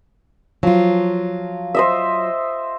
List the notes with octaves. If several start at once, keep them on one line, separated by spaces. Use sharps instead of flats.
F3 F#3 F4
C5 D#5 E5